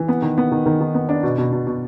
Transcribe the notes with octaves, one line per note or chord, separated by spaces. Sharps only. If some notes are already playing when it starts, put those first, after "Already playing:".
Already playing: E3
B3
D#3
B3
D#3
D#3
D#3
B3
D4
B2
B2
B2
B2